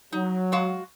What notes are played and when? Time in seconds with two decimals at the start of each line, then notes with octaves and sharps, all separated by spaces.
0.12 F#3 D#4
0.52 G#3 F#4 F5